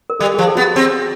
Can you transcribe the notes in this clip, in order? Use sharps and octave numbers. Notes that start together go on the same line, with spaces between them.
A#4
G3 A4
G#4
F3
A4
B3 F#4
G4
C4 G#4